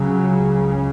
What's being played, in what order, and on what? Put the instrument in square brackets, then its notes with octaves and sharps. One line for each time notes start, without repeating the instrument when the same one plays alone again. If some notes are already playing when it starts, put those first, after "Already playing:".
Already playing: [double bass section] C#2 C#3 F#3